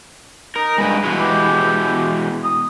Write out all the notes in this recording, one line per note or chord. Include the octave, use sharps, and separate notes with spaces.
D#4 A#4
G2 C#3 G#3 B4
B2 E3 G#3
G4
D#6